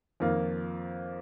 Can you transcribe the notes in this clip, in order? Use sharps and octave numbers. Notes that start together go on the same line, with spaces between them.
F2 D#3 A#3 F4